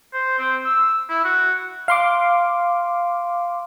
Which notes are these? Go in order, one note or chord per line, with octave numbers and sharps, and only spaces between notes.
C5
C4
E6
E4
F#4
F5 C6 D6